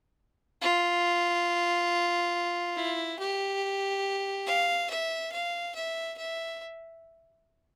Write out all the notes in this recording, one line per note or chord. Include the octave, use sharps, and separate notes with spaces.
F4
E4
G4
F5
E5
F5
E5
E5